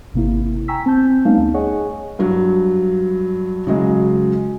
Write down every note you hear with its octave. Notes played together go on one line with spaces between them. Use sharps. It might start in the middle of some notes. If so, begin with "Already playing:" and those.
G#1 C3 A#3 E4
G5 G#5 A#5 C#6 E6 B6
C4 A5 G6
G3 A3 B3 C#4 D#4 F5
D2
G#4 C#5 D#5 F#5 G#5 C#6
G2 F#3
C#3 F#3 G#3